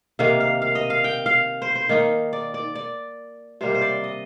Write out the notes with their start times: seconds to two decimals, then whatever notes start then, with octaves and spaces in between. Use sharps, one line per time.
0.19 C3 D#3 A#3 F5
0.40 F5
0.62 F5
0.75 D#5
0.90 F5
1.04 G5
1.26 F5
1.62 C5
1.75 C5
1.89 D#3 A#3 D#4
2.33 D5
2.54 D5
2.75 D5
3.61 C3 D#3 G3 A#3 C5
3.74 C5
3.82 D5
4.04 D#5